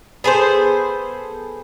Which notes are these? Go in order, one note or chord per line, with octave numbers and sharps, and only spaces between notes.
B3 G#4 A4 C5